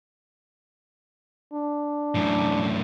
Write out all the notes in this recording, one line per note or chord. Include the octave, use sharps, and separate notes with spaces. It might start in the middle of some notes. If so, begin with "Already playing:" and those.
D4
F#2 A2